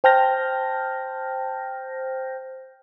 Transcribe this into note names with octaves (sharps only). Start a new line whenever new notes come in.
C5 G5 A5 F6 G6 A#6